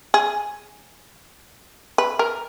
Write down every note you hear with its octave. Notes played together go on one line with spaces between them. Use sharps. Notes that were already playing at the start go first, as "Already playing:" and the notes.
G#4
B4
A#4